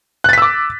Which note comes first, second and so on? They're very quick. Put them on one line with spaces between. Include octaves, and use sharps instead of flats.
F#6 A6 B6 E6 D6